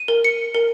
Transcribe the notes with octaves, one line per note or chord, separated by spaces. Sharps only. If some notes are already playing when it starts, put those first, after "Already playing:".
Already playing: D#7
A#4
C#7
A#4